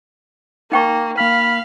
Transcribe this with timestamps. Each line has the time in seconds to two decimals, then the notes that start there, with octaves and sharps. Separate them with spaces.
0.72 A#3 D#4 G5 C#6
1.18 A#3 F5 B5 F6